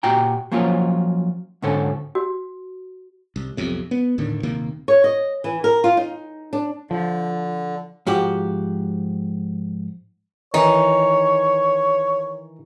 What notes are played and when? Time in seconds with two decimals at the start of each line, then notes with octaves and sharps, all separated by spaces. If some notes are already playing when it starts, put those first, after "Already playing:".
0.03 A#2 F#4 G4 G5 A#5
0.52 F3 F#3 A#3 C#4 F4
1.62 D2 G#2 D3 C#4 A4
2.15 F#4
3.36 C2
3.57 B1 F2 C3
3.91 B3
4.18 D#1 A2 D3 D#3
4.43 D#1 C3 D#3 A#3
4.88 C#5
5.04 D#5
5.44 E3
5.64 A#4
5.84 F4
5.97 D#4
6.53 D4
6.91 D3 F3
8.07 G#2 F3 F#4 G4
10.54 D#3 E3 D#4 C#5